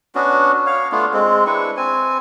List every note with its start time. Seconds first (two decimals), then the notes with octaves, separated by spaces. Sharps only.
0.15 B3 C#4 D4 F#4
0.66 C#5 F5
0.92 A3 B3 D4 F4
1.13 G#3 C4
1.47 D4 E4 B4 C#6
1.77 C4 G#5